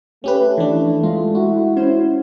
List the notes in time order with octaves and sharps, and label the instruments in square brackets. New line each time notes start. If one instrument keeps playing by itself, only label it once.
[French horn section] A3 [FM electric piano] C#4 G4 B4
[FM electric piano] E3 D4
[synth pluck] G#3 [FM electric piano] F4
[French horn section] E4 [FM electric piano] F#4
[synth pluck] C#4 C5